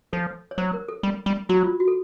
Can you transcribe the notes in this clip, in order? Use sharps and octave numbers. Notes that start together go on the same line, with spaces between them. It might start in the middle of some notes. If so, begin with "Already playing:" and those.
F3 A4
C#5
F#3 C5
A#4
A4
G3
G3
F#3 F#4
F4
F#4
A4